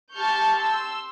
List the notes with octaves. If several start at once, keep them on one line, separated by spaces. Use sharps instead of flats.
G4 A5 C#6 F6 G6
C6 E6